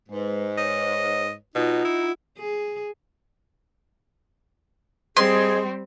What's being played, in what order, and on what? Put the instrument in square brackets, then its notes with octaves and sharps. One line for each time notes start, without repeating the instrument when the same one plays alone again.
[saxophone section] G#2 [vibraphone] G#3 B4
[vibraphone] B4 C#5 [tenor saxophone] D#5
[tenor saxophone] B2 [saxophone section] D#4 [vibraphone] F4 F#5
[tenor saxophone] E4
[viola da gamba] G#4
[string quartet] G3 C4 [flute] G#4 [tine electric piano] C5 D#5 G#6 [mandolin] C6